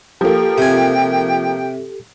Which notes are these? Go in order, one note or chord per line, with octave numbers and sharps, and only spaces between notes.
F3 A#3 G4 A4 G5
C3 G#5